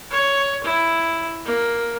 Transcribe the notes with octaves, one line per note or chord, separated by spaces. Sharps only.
C#5
E4
A#3